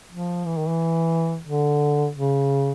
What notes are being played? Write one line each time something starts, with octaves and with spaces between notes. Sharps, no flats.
F3
E3
D#3
E3
D3
C#3